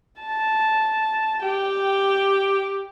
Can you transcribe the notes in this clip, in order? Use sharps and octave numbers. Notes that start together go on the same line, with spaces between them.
A5
G4 G5